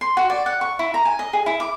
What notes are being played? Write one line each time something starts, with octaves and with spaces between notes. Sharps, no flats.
C6
F#4
D5
F#5
C#6
E4
A#5
G#5
D#5
G#4
E4
D6